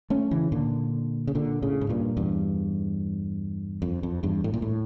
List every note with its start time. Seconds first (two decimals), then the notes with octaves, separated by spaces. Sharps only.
0.10 A3 C#4
0.31 C#3 E3
0.52 A#2 D3
1.27 C#3
1.35 A#2 D3
1.62 A2 C#3
1.81 A2
1.89 G2 A#2
2.17 E2 G2
3.82 F2
4.03 F2
4.23 E2 G2
4.44 A2
4.54 A#2
4.62 A2